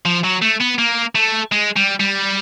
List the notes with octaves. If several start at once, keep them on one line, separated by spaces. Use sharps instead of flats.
F3
F#3
A3
B3
A#3
A3
G#3
G3
G3